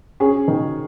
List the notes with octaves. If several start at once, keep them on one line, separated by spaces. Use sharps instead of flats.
C#4 G#4
D#3